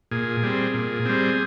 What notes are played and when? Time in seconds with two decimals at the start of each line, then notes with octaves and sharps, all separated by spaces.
0.11 A#2 G#4
0.43 G3 C4
0.74 A#2
1.05 G3 C4